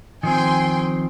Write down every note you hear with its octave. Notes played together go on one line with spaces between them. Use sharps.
D#3 F3 C4 G5 G#5 C6